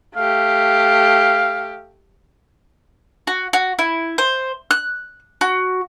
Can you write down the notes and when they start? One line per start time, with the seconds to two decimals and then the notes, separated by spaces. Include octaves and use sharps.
0.16 A3 G4 F5
3.27 F#4
3.53 F#4
3.79 E4
4.18 C5
4.71 F#6
5.41 F#4